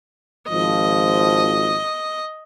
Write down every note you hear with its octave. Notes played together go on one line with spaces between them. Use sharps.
G#1 F3 D#5